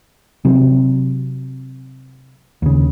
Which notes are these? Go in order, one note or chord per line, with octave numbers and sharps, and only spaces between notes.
C3 F#3 C4
D#2 C#3